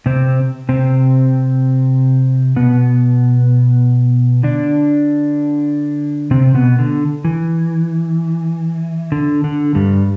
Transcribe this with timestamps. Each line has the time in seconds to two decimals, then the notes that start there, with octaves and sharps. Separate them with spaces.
0.06 C3 C4
0.69 C3 C4
2.56 B2 B3
4.43 D3 D4
6.31 C3 C4
6.54 B2 B3
6.79 D3
7.25 E3
9.12 D3
9.44 D3
9.75 G2 G3